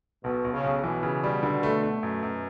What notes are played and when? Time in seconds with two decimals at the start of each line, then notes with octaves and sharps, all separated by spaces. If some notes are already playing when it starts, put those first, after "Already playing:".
0.24 B1 B2
0.44 B1
0.53 C#3
0.64 B1
0.84 B2 E3
1.03 C#3
1.24 G3
1.43 D3
1.63 A3
1.83 A3
2.02 F#2 B2
2.23 F#2